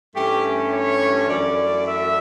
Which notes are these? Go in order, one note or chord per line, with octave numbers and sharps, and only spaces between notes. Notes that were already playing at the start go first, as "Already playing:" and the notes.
G2 E3 A3 C#4 G4
C#5
F#2 E3 A3 D5
E5